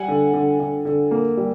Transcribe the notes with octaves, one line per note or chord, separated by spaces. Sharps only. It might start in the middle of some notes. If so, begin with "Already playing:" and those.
Already playing: G3 F#5 G#5
D3
D3
D3
D3
A#3
G3